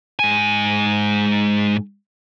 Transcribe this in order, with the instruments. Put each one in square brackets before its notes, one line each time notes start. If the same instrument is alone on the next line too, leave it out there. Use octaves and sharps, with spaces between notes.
[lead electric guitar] G#2 G#5